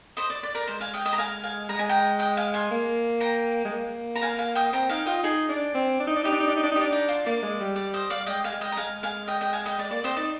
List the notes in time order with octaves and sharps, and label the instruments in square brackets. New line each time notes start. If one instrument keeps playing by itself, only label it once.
[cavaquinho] C5 D#5
D5
D5
A#4
[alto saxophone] G#3 [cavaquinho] C5
[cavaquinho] F5 G#5
D#5 G5
D#5 G5
A#5
F5 G#5
F5 G#5
[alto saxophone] G#3 [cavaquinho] A#5
[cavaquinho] G#5
G5 A#5
D#5 G5
F5 G#5
G#5 C6
[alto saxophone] A#3
[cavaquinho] G5 A#5
[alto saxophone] G#3
A#3
[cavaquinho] A#5
F5 G#5
F5 G#5
D#5 G5
[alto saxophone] C4 [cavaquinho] G5 A#5
[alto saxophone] D#4 [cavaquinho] F5 G#5
[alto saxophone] F4 [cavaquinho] D#5 G5
[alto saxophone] D#4 [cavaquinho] G#4
[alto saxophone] D4
C4
D4
D#4
D4
[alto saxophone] D#4 [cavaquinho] G4
[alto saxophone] D4
D#4
D4
D#4
D4
D#4
[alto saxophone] D4 [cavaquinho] G4
[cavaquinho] D#4
F4
[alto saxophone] A#3 [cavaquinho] D5
[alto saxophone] G#3
G3
[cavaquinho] D5
C5 D#5
D5 F5
[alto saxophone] G#3 [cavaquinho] D#5 G5
[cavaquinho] F5 G#5
[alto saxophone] G#3
[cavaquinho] D#5 G5
A#5
[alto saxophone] G#3 [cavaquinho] F5 G#5
[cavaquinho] F5 G#5
D#5 G5
D#5 G5
F5 G#5
D#5 G5
[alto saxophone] G#3 [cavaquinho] D5
[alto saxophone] A#3 [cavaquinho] D5
[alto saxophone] C4 [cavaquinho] C5 D#5
[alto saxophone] D#4 [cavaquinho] D5